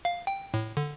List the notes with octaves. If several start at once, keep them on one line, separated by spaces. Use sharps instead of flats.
F5
G5
A2
D3